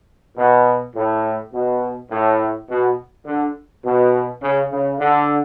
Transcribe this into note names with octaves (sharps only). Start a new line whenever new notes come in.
B2
A2
B2
A2
B2
D3
B2
C#3
C#3
D3